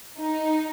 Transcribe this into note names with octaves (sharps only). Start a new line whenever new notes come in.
D#4